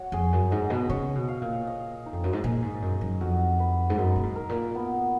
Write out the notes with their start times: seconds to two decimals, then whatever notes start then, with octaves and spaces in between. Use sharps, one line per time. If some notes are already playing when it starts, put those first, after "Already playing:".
Already playing: F#4 C#5
0.12 F2 G#4
0.33 F#2
0.51 G#2 D#5
0.70 B2
0.89 C#3 C#5
1.15 B2
1.28 F5
1.42 A#2
1.67 D#5
2.06 D#4
2.13 F2
2.24 F#2
2.33 G#2
2.44 A#2 G#4
2.62 G#2
2.82 F#2 D#5
3.01 F#2
3.20 F2 F#4
3.59 B4
3.90 G#2
3.97 F#2 D#4
4.16 A#2
4.23 G#2
4.35 A#4
4.49 A#2
4.75 B3